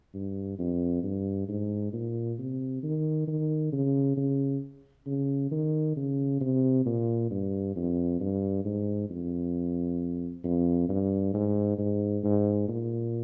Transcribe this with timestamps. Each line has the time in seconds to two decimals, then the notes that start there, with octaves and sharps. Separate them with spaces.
0.14 G2
0.59 F2
1.03 G2
1.48 G#2
1.93 A#2
2.38 C3
2.83 D#3
3.27 D#3
3.72 C#3
4.17 C#3
5.06 C#3
5.51 D#3
5.96 C#3
6.41 C3
6.85 A#2
7.30 G2
7.76 F2
8.20 G2
8.65 G#2
9.09 F2
10.44 F2
10.89 G2
11.34 G#2
11.78 G#2
12.23 G#2
12.68 A#2